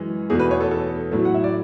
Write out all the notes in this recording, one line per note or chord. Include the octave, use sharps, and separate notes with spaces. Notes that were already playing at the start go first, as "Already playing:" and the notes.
Already playing: F#2 E3 G#3
E2 B2 A3 G#4
B4
C#5
A4
A4
A2 F#3 A3
F#5
E5
D5